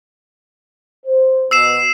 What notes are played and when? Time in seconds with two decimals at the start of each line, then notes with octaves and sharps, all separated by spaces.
1.06 C5
1.51 B2 E6 C7 E7